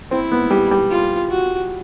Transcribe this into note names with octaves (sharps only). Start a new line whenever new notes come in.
C4 E4
B3
G3
G3
F4
F#4